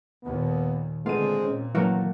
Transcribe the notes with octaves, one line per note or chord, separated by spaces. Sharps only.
D#2 A#2 B3
D3 G#3 A3 B3 C4 F4 D#7
A#2 C#4
F#2 E3 F#3 A3 A#3 A#4